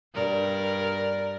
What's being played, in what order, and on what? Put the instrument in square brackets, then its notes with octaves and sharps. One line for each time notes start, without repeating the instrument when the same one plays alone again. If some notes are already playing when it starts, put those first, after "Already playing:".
[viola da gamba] G2 A#4 D5